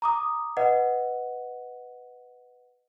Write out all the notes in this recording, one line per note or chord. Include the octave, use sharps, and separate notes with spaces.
A#5 D6 D#6
B4 D#5 F#5